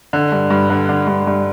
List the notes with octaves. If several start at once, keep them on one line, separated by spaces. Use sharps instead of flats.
D3
G2
G2
D3
D3
G2
G2